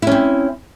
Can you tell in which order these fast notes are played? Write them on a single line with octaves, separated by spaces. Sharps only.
E4 C#4 C4